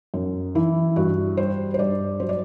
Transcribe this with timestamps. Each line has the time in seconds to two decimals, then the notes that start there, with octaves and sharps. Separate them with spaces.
0.14 F#2
0.55 E3 E4
0.96 G2 F#4
1.37 G3 C5
1.74 C5
1.78 G2 D5
2.20 F#3 C5
2.29 D5